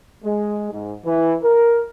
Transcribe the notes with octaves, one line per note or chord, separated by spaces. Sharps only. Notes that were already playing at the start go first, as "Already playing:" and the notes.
G#3
G#2
E3
A#4